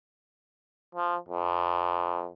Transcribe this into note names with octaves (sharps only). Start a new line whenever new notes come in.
F3
F2